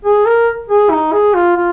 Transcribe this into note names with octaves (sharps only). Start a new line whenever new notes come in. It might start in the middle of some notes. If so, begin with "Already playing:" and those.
G#4
A#4
G#4
D#4
G#4
F4
F4